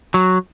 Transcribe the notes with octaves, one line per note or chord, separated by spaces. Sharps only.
F#3